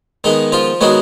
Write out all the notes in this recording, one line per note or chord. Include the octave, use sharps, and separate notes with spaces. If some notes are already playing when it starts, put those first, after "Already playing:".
D#3 G#3 B3 D#4
F3 F4
D#3 F#3 G#3 B3 F#4